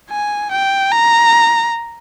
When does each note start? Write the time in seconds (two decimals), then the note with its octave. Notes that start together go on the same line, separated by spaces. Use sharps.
0.10 G#5
0.52 G5
0.92 A#5